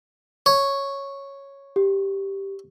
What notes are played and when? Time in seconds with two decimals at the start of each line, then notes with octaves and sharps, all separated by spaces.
0.46 C#5
1.76 G4